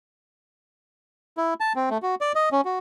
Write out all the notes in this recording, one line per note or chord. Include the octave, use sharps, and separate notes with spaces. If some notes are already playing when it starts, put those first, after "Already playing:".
E4
A5
C4
A3
F#4
D5
D#5
C#4
F#4